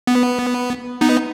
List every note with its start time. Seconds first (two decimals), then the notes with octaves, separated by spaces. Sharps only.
0.07 B3
1.01 B3 D#4